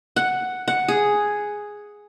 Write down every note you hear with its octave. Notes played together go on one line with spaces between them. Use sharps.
F#5
F#5
G#4